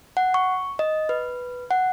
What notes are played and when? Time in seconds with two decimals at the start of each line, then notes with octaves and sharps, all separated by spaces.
0.17 F#5
0.34 C#6
0.79 D#5
1.09 B4
1.71 F#5